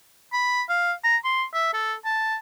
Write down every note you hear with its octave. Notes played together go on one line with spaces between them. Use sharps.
B5
F5
A#5
C6
E5
A4
A5